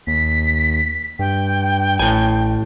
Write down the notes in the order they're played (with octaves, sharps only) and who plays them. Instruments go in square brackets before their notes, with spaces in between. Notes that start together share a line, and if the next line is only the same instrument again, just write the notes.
[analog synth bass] D#2 [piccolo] B6
[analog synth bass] G2 [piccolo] G5
[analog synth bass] A1 [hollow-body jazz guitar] A2 G#5